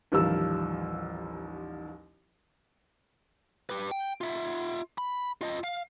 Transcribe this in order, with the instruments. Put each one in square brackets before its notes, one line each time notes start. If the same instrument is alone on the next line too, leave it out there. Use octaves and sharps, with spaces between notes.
[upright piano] A1 D#2 F3 G3 A#4 E6
[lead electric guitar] G4 B4
G5
F4 E5
B5
F4 D#5
F5